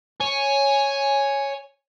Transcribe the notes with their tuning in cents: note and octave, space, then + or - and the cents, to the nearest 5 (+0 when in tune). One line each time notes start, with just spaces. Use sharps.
C#5 +0 G#5 +0